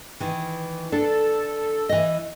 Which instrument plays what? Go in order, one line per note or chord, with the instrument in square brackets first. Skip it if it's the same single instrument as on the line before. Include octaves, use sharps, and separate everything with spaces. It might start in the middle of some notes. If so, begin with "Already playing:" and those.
[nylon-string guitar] D#3 E3
[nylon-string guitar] D4 [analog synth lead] A4
[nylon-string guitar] E3 D#5